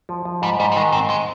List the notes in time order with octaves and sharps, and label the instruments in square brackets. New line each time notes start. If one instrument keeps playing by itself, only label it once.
[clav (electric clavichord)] F3
F3
[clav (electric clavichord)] G#2 [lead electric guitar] G3
[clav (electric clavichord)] G#2 [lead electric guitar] G3
[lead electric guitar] G3
[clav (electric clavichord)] D#3 [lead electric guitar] G#3
[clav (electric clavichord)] G#2 [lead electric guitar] C4
[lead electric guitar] G#3